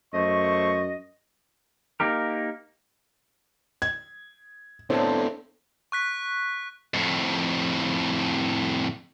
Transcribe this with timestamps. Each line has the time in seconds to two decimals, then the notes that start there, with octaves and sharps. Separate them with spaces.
0.14 F#2 A3 C5 D#5 C#6
2.00 A#3 D#4 G4 A#4
3.82 G#6
4.90 A2 B3 C4 D4 A5
5.92 C#6 F#6 B6
6.94 F2 A2